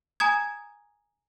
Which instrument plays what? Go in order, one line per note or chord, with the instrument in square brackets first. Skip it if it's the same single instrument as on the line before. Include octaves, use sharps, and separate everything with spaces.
[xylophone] G#5 A#5 D#6 G#6